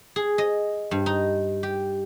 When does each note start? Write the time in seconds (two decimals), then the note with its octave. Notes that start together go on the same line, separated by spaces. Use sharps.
0.16 G#4
0.38 D#5
0.91 G2
1.06 D#4
1.63 G4